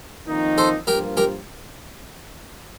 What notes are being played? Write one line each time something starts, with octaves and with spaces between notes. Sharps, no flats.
F2 D#3 A#3 D#4
A4 C5
G2 F3 A#3 F4 G4 A#4
G4 A#4